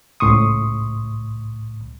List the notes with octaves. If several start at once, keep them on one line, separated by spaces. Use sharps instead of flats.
C#2 A2 C6 C#6 D#6